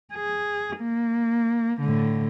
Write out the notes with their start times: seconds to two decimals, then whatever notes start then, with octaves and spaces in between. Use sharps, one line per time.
0.14 G#4
0.78 A#3
1.81 A2 D3